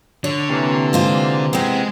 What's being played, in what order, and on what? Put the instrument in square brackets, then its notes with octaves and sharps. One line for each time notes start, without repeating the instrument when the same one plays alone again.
[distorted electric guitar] D3 [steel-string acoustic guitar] C#5
[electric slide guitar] C3 E3 A#3
[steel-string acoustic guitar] G#3 F4 C5
[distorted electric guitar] G#3 [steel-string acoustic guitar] B3 C4